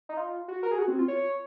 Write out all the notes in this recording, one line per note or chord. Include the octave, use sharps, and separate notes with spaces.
D#4
F4
F#4
A#4
G#4
F#4
C4
F4
C#5